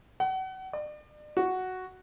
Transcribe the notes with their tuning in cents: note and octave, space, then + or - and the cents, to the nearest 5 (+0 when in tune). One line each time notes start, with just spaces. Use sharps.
F#5 +35
D5 +40
F#4 +0